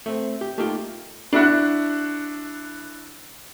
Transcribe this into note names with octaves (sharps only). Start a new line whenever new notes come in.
A3 C4
G4
A3 A#3 D#4 F4 G4
D4 E4 F#4